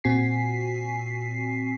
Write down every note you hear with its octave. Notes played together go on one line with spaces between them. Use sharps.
A#2 C4 F#4 G#5 B6 C7